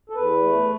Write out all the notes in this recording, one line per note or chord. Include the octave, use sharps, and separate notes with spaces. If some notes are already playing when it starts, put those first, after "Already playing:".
A4
E2 B4
A3